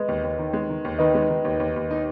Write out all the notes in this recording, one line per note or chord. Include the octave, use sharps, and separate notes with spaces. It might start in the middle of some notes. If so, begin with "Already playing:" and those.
Already playing: G#3 B4 D#5
D#2
D#2
D#3
G#3
D#3
D#2
D#3 B4 D#5
G#3
D#3
D#2
D#2
D#2
D#4